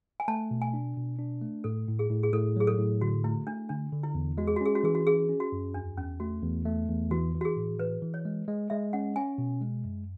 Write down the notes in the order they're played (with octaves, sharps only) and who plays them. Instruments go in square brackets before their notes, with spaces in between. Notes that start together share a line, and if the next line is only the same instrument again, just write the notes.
[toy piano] G#5
[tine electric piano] A3 [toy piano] A5
[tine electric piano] B2
[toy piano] G#5
[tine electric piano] D4
B2
D4
A3
[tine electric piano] A2 [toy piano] A4
[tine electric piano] A2
[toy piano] G#4
[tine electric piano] A2
[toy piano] G#4
[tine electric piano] A2 [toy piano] A4
[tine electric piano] F#3 [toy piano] G#4
[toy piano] A4
[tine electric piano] A2
[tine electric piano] D3 [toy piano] F#4
[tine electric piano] A3 [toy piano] E4
[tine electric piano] A3 [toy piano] D4
[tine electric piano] D3 [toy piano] D4
[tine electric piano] D3
[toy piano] E4
[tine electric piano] E2
[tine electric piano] G#3 [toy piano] F#4
[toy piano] G#4
F#4
[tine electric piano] C#4 [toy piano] G#4
[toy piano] F#4
[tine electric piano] E3 [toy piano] G#4
[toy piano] F#4
[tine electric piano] C#4 [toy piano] G#4
[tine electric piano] C#4
[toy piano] F#4
[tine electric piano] F#2
[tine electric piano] E2 [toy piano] D4
[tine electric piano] E2 [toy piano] C#4
[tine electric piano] A3 [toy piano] F#4
[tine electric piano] E2
A3
E2
[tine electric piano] E3 [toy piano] F#4
[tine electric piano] E3
[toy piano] F#4
G#4
[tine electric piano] A2
[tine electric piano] E3 [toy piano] B4
[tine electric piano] E3
[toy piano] C#5
[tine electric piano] G#3
G#3
[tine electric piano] G#3 [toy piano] E5
[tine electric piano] C#4 [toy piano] F#5
[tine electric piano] C#4 [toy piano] G#5
[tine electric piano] B2
G#3
F#2